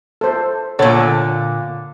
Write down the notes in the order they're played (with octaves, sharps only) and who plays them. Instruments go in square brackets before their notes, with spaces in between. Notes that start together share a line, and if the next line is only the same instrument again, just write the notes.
[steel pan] A4 C5
[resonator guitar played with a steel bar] A#2 D3 [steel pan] A4 C#5 F#5